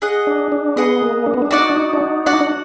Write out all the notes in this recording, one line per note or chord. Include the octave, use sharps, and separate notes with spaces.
G#4 D#5 F#5
D4
D4
B3 G#4 D#5 F#5
A#3
D4
B3
D4
D#4 F#4 D5 F#5
D4
D#4
D4
D#4
D4 F#4 D5 F#5
D#4
D4